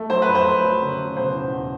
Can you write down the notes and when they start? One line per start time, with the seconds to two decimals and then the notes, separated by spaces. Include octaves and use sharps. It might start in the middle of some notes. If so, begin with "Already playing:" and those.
Already playing: A3
0.09 F#3 C5
0.22 B4
0.28 F2
0.35 C5
0.46 A3
0.63 F#3
0.81 C#3
0.99 C#3
1.16 B2 C5
1.35 E2
1.52 E2